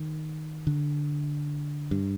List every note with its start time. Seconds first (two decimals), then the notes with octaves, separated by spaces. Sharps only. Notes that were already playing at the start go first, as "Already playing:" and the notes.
Already playing: D#3
0.67 D3
1.91 G2